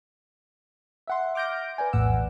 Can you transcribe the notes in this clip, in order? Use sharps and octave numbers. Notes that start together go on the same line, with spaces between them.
E5 F#5 C6
D6 F6 G6 A#6 D7
B4 D5 G#5
A#1 E2 A2 F#5 E6